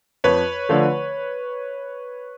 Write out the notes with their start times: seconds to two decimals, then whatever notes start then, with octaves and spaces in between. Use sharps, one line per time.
0.24 F2 B4 C#5
0.69 D3 F3 A3